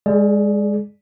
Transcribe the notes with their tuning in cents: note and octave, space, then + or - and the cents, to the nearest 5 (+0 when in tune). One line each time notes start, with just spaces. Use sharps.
G#3 -20 G#4 +30 D5 +0